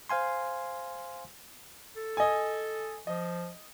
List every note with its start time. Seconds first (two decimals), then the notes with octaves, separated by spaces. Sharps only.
0.09 C5 F5 G#5 C6
1.96 A4
2.17 D#5 G#5
3.07 F3 D#5